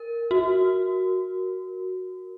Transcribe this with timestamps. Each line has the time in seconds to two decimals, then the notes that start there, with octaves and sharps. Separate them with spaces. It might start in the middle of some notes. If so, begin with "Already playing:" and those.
Already playing: A#4
0.31 F#4